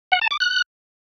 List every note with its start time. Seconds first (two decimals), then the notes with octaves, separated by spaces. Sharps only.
0.12 F#5
0.21 A5
0.31 D6
0.40 F#6